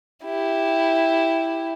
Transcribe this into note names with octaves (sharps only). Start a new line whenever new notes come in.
E4 G4